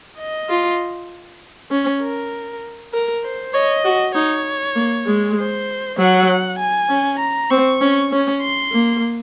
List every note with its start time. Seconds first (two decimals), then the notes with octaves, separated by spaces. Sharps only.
0.19 D#5
0.49 F4
1.71 C#4
2.02 A#4
2.94 A#4
3.24 C5
3.54 C#5 D#5
3.85 F#4
4.15 D#4 C#5
4.76 A#3
5.06 G#3
5.37 C5
5.98 F#3 F#5
6.59 G#5
6.89 C#4
7.20 A#5
7.51 C4 C#6
7.81 C#4
8.12 C#4
8.42 C6
8.72 A#3